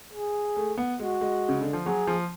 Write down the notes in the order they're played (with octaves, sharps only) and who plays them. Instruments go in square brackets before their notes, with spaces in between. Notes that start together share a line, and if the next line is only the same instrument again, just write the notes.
[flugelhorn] G#4
[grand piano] A3
B3
[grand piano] G#3 [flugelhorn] F#4
[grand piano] G#3
C#3
D3
F3
[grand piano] F#3 [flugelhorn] G#4
[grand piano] F3